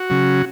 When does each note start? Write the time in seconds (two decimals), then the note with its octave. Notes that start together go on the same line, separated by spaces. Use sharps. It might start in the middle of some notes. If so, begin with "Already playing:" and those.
Already playing: F#4
0.10 C#3 F#3